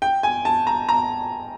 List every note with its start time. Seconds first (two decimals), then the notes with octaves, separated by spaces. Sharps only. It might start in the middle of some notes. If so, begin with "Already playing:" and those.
0.02 G5
0.23 G#5
0.45 A5
0.67 A#5
0.89 A#5